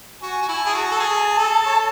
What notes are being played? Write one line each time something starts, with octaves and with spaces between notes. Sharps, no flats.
F#4 G#5
F#4
E4
G#4 A5
F#4
A4
G#4
A4
C#5